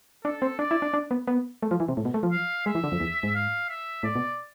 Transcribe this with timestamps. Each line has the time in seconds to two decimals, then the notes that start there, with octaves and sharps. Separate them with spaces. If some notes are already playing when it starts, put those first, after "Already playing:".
0.24 D4 A4
0.42 C4
0.59 D4 D5
0.71 E4
0.82 D4
0.94 D4
1.11 B3
1.27 B3
1.62 A3
1.71 F3
1.80 E3
1.88 C3
1.97 A2
2.05 B2
2.14 A3
2.23 F3
2.32 F5
2.66 G#3 E5
2.75 E3
2.84 D3
2.92 F2
3.00 E2
3.23 G#2
3.35 F5
3.69 E5
4.03 A2 D5
4.15 B2